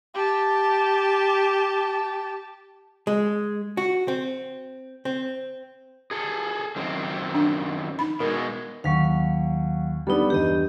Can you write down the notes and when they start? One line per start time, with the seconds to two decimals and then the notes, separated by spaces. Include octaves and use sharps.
0.14 G4 A5
3.07 G#3
3.77 F#4
4.08 C4
5.05 C4
6.11 G#4 A4
6.76 F#2 D#3 C4
7.34 D4
7.99 D#4 B5
8.20 B2 G#3 A#4
8.84 D#2 F#3 F5 C#6
10.07 G3 B3 D4 D#4 A4
10.30 E2 G2 G4 D#5